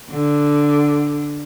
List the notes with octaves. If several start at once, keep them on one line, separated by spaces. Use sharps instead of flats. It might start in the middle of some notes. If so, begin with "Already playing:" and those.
D3